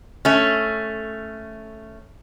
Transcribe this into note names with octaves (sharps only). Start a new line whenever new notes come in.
A3 C#4